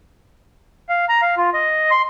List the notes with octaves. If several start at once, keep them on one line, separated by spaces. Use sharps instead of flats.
F5
A#5
F5
F4
D#5
C6